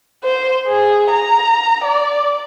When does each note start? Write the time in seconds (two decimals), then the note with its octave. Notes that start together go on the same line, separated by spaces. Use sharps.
0.23 C5
0.68 G#4
1.11 A#5
1.84 D5